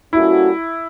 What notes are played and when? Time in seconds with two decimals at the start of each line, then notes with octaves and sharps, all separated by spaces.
0.13 G3 A#3 C#4 E4 F#4 A4